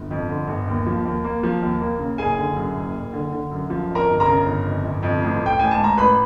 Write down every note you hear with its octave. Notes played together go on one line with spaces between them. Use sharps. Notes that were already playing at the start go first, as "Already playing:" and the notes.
Already playing: G1
F2
D3
G1
D#2
F3
D#2
A#3
F3
D#2
A#3
C#3
F#1 G#4 G#5
D3
F#2
F#1
F#1
D3
D3
F#2
F3
F2
A#4 A#5
G1
A#4 A#5
C#3
G1
F2
G1
F2
A1
A3
G5
A1 G#5
A5
G#2
A#5
A1 B4 B5